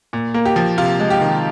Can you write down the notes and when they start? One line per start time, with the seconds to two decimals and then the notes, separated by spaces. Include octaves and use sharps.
0.13 A#2
0.34 A#3
0.45 G4
0.56 F3
0.78 C3 F4
1.00 G#3
1.10 G4
1.21 D#3